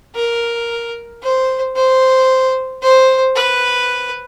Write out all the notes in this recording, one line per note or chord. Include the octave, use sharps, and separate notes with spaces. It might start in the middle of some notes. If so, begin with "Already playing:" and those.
A#4
C5
C5
C5
B4